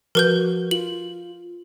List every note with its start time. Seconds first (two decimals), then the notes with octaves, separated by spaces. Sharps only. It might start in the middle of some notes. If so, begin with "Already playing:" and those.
0.15 F3 F#4 A#4 B4 G6
0.71 F4 F#7